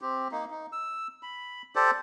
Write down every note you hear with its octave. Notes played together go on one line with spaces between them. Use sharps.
C4 G4
A#3 D#4
D#4
E6
B5
G4 A4 C5 D5